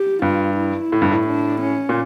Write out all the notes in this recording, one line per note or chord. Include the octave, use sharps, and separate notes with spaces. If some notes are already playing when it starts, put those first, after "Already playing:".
Already playing: G4
G2 F4
E4
A2
G2
A2
D4
C#4
A#2